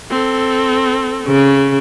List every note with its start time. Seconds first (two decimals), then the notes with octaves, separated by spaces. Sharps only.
0.10 C4 A4
1.26 C#3